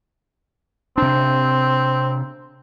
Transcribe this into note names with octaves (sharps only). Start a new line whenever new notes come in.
C3 C4 D4